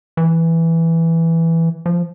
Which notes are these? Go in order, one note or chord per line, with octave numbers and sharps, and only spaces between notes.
E3
F3